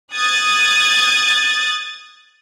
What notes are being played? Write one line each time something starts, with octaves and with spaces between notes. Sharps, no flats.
D#6 F#6 G#6 A6